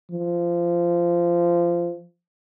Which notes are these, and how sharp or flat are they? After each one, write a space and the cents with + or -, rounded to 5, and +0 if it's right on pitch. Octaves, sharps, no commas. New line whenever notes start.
F3 -20